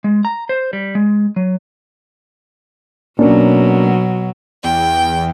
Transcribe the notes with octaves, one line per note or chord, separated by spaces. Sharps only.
G#3
A#5
C5
G3
G#3
F#3
B2 F#3 A#3 C#4 D4
E2 G5